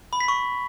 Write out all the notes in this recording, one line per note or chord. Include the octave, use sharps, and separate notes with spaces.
B5
B6
C#6